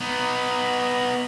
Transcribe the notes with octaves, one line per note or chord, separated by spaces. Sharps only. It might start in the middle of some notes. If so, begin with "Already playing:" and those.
B3 D#4